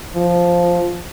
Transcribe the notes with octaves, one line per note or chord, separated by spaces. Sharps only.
F3